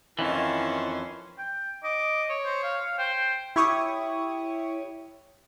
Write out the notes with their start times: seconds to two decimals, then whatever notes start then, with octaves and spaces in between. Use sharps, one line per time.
0.19 F2 D#3 E3 C#4 E4 A5 C6
1.39 G5
1.84 D#5 D6
2.29 C#5
2.44 C5
2.64 F5
2.99 C5 G5
3.56 E4 G4 C#5 C#6 D#6